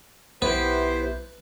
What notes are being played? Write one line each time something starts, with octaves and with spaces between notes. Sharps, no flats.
B1 B3 E4 G4 B4 C5